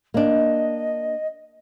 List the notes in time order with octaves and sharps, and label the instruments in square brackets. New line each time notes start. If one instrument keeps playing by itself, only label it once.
[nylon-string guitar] A#3 D4 [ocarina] D#5